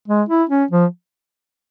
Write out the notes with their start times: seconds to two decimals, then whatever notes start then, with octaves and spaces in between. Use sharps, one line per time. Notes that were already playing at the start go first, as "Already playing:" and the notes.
0.08 G#3
0.29 E4
0.50 C#4
0.71 F3